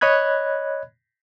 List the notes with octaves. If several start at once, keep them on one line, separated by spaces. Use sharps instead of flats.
C#5 D#5 B5 F#6 G#6